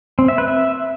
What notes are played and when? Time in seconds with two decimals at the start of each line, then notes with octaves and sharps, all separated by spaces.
0.19 C4
0.28 E5
0.38 B4
0.48 E5